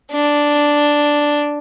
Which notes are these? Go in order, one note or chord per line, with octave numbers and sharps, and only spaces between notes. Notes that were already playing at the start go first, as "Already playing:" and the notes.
D4